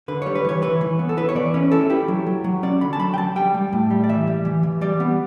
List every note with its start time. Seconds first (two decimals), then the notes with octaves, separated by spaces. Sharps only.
0.08 D3 B4
0.22 G3 C#5
0.35 B4
0.45 E3 C#5
0.62 E3 B4
0.81 E3
0.99 B3
1.09 A4
1.17 E4 B4
1.29 C#5
1.35 E3 D5
1.54 C#4 B4
1.72 E4 A4
1.90 E4 G4
2.08 F#3
2.27 F#3
2.44 F#3
2.63 C#4 D5
2.81 D3 B5
2.93 A5
3.00 F#3 B5
3.14 G5
3.18 F#3 A5
3.36 G3 G5
3.54 G3
3.73 A2
3.90 G3
4.04 D5
4.09 E3 E5
4.27 G3
4.45 E3
4.63 E3
4.81 G3 D5
5.00 B3